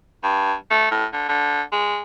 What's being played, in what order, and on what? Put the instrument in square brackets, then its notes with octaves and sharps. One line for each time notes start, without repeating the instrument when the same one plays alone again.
[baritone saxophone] G2
A3
A2
D3
D3
G#3